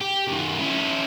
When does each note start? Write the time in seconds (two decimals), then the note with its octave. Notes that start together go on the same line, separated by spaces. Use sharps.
0.01 G4
0.28 F#2 D#3
0.59 C#4 E4